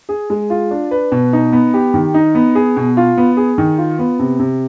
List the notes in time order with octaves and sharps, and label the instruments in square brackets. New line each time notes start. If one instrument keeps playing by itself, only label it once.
[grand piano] G#4
G#3
F4
D4
B4
B2
D#4
B3
G4
D#3
D#4
B3
G#4
B2
F4
B3
G#4
D#3
F4
B3
C3
C3